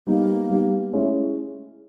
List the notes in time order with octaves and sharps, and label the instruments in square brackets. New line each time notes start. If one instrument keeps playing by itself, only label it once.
[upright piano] G3 B3 D#4 G4 [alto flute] A#3
[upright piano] G3 B3 D#4 G4
[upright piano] G#3 C#4 E4 [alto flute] A3